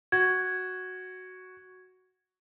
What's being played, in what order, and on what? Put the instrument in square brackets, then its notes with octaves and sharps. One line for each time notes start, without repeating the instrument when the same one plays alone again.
[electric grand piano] F#4 [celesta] G#6